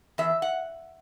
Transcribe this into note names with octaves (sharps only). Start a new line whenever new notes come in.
E2 E5
F#5